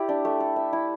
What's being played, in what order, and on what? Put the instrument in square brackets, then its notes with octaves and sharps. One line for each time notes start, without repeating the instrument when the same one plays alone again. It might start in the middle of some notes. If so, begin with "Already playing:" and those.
Already playing: [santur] E4 G4 D5
D4
A3
A4
E5
E4